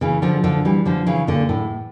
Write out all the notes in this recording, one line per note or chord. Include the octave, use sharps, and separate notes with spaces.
C#3 E3
D3 F3
D3 F3
E3 G3
D3 F3
C#3 E3
A#2 D3
A2